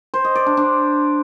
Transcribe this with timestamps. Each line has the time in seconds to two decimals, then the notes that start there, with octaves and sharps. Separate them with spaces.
0.14 C5
0.25 D#5
0.35 D5
0.46 D4
0.57 D4